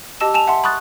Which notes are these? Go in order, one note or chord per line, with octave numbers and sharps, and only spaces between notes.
G4 D#5 A5 E6 E7
G#5 A5 E7 F7
E5 F#5 A5 C6
B5 C#6 D#6 F#6 A6